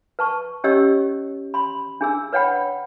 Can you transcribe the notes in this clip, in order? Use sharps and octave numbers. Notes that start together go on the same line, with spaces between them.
B4 A5 C#6
C#4 G4 C#5 D#5 E6
B5 C6
D4 G#4 E6
B4 C#5 F#5 G5 B5